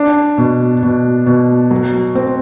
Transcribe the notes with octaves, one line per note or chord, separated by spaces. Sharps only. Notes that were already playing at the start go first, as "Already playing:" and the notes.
Already playing: D4
B2
B2
B2
F#3
C4